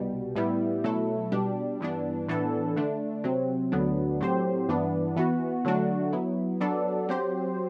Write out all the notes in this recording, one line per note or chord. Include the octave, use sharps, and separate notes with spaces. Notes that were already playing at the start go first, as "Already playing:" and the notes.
Already playing: C2 B2 G3
A2 G3 B3 E4
B2 F#3 A3 E4 A4
B2 G3 D4 G4
G2 E3 B3 D4
A2 E3 B3 D4 A4
D3 A3 D4
C3 F#3 C4
D2 D3 F#3 B3 D4
A2 F#3 C4 G4 C5
G2 E3 B3 D4
E3 B3 F#4
D3 F#3 A3 D4 F#4
F#3 B3 E4
F#3 B3 D4 A4 D5
F#3 C4 G4 C5